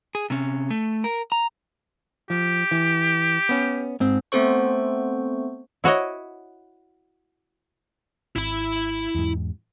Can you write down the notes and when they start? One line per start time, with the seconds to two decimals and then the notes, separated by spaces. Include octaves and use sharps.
0.15 G#4
0.30 C3 C#4
0.70 A3
1.04 A#4
1.32 A#5
2.30 F3 G4
2.71 E3
3.49 B3 C#4
4.00 G#2 C4
4.32 A3 B3 C4 A4 C5 C#6
5.84 E4 F#4 C#5 D#5
8.36 G#1 E4 B5
9.15 E2 G#2